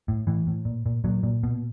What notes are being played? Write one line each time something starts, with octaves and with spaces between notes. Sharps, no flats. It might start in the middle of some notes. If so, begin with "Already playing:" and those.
A2
A2 E3
A2
A#2
A#2
A#2 F#3
A#2
B2